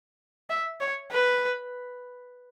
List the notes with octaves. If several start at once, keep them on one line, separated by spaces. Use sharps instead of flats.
E5
C#5
B4